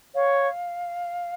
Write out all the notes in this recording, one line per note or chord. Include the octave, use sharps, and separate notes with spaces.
C#5 F5